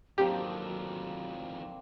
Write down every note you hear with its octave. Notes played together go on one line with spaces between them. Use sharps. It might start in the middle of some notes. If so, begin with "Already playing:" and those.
F2 D#3 F#3 A#3 C4 D4 G4